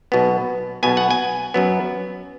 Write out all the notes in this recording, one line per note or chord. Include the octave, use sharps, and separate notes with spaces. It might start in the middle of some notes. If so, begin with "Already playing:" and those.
B1 B2 B3
B1 B2 B3 G#5
F#5
G#5
F#2 F#3 B3